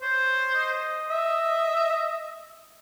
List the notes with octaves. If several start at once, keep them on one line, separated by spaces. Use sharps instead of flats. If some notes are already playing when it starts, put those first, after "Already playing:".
C5 C#5
D#5
E5